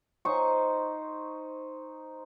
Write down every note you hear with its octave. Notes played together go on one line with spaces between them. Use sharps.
D#4 C5 C#6